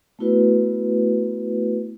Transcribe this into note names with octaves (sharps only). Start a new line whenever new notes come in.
A3 B3 E4 F#4 B4